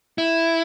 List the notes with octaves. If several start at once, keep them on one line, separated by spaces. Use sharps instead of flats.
E4